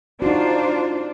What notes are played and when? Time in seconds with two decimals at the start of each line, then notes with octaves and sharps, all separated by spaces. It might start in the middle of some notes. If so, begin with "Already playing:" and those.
0.22 D4 D#4 F4 F#4 C5